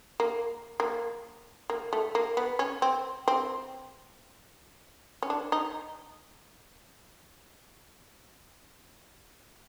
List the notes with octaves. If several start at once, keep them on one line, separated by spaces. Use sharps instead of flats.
A#3
A#3
A#3
A3
A#3
B3
C#4
C4
C4
C#4
D4
D#4